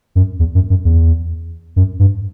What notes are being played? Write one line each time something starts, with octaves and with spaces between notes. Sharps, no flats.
F#2
E2
F#2
F#2
E2
F#2
G2